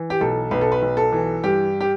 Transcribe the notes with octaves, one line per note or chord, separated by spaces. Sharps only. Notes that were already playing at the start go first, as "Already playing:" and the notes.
Already playing: E3
G4
B1 A4
B1 B4
A4
B4
B1
A4
E3
G2 G4
G4